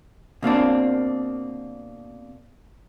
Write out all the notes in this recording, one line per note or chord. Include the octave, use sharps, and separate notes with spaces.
B2 A#3 C4 D4